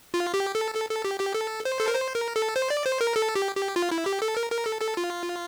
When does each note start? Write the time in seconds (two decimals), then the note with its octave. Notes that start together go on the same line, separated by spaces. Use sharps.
0.14 F4
0.34 G4
0.55 A4
0.75 A4
0.89 A4
1.04 G4
1.20 G4
1.34 A4
1.65 C5
1.80 A4
1.88 A#4
1.95 C5
2.15 A#4
2.36 A4
2.56 C5
2.70 D5
2.86 C5
3.01 A#4
3.16 A4
3.35 G4
3.56 G4
3.76 F4
3.91 E4
4.06 G4
4.22 A4
4.37 A#4
4.51 A#4
4.66 A4
4.81 A4
4.97 F4